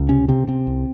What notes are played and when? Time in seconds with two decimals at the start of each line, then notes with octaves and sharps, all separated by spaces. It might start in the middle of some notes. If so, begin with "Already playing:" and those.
Already playing: C#2
0.09 C3 C#4
0.28 C3 C4
0.48 C3 C4
0.67 C2